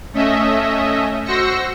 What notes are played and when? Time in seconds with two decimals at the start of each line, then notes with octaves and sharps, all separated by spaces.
0.13 A3 C#4 D#5 E5
1.25 F#4 C5 E6 A#6 C#7